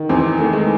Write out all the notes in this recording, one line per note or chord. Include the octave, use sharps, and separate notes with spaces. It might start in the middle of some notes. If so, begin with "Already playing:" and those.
Already playing: D#3
E2 C4
D#3 A3
G#3